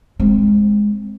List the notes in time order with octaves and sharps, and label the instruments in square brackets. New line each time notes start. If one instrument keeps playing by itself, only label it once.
[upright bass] G#3 C4